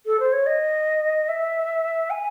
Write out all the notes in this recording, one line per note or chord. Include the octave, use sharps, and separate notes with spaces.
A4
C5
C#5
D#5
E5
G#5